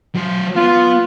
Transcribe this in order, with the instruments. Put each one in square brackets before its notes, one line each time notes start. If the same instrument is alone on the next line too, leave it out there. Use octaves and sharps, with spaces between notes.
[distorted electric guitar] F#3 C5
[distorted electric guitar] B3 [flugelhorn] F4